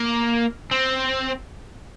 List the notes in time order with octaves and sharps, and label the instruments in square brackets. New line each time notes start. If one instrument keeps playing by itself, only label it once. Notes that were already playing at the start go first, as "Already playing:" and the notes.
Already playing: [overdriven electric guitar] A#3
C4